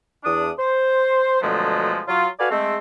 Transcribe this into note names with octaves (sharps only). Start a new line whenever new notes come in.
E2 D4 D#6
C5
B2 D3 F3 F#3 G#3 A3
F#3 F4
F#4 A4 B4 D5 F5 G#5
G#3 A3 C4